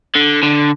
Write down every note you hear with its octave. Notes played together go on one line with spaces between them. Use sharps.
D3
D3